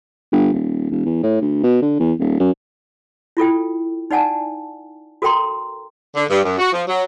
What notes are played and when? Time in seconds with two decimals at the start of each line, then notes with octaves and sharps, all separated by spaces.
0.32 G1
0.53 D#1
0.91 E1
1.05 E2
1.23 A2
1.41 D2
1.63 B2
1.82 D3
1.99 E2
2.19 D#1
2.40 F#2
3.37 E4 F4 A4 G5
4.11 D#4 D5 F#5 G#5 A5
5.22 F#4 A4 A#4 G5 A#5 C6
6.15 D3
6.30 G2
6.44 F#2
6.59 F#4
6.73 F3
6.87 F#3